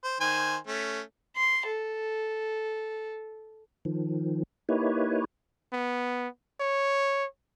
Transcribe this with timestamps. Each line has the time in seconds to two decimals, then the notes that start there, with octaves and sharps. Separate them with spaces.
0.04 C5
0.20 D#3 C5 G#5
0.67 A3 C#4
1.36 C6
1.67 A4
3.85 D#3 F3
4.69 A#3 D#4 E4 G4 B4 C#5
5.73 B3
6.60 C#5